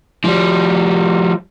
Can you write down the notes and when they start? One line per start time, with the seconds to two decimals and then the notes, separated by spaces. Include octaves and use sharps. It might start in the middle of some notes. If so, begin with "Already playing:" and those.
0.24 F3 G3